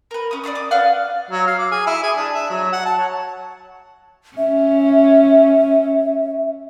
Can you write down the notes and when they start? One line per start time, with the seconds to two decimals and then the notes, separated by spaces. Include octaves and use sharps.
0.11 A#4 B4
0.31 C#4 D#6
0.44 D5 F5 A5 D#6
0.55 D6 D#6
0.71 D4 B4 F5 F#5
1.31 F#3
1.47 F5
1.59 D6
1.72 G#4
1.87 E4
2.03 G#4
2.17 D4
2.34 E5
2.50 F#3
2.72 F#5
2.86 A5
2.98 C#5
4.37 C#4 E5